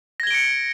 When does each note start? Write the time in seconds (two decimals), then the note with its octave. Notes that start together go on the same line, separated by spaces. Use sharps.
0.20 A#6
0.23 G#6
0.27 G7
0.31 D7
0.34 C#7